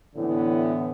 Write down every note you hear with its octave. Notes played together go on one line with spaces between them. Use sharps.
A2 D3 E3 B3